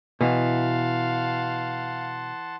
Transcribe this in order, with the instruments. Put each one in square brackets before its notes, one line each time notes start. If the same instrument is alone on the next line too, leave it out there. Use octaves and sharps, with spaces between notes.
[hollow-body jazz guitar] B2 [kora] E3 [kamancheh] F5 [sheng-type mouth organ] F#5 A5 C6